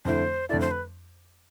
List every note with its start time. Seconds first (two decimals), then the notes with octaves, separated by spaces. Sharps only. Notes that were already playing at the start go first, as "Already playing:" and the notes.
0.05 F2 D3 A3 E4 C5
0.49 F2 D3 A3 E4 D5
0.60 C5
0.71 B4